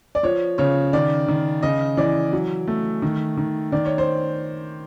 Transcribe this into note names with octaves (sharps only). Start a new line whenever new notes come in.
D5
F3 C#5
C#3 C#5
D#3 D5
D#3
C#3 D#5
E3 D5
F#3
A3
D#3
D#3
D#3 D5
C#5
C5